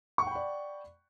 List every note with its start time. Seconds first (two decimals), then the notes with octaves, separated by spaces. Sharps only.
0.18 C#6
0.23 F#5
0.27 G5
0.31 B5
0.35 D5